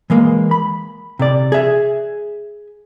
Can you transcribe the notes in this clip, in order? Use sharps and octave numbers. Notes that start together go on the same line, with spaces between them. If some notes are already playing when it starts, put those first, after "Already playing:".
E3 G#3 A#3
B5
C3 D5
G#4 E5